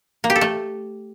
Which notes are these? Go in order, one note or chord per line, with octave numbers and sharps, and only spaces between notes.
A#3
G4
A4
A3